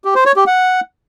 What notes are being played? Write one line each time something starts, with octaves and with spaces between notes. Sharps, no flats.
G4
C5
C#5
G4
F#5